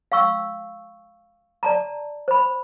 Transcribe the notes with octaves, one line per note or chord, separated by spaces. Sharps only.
F5 G5 C#6 E6
D5 A5 A#5
C5 B5